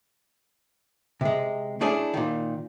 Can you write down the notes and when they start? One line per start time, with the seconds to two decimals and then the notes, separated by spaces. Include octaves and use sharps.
1.21 C3 G#3
1.81 A3 C#4 D4 E4 G#4
2.14 A#2 D#3